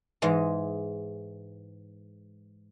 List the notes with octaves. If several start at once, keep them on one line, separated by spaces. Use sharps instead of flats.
G#2 E3 G#3